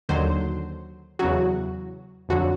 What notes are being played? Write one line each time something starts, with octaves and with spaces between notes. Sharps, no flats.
D#2 D3 F#3 C5
E2 C#3 F#3 F#4
F2 D3 F#3 F#4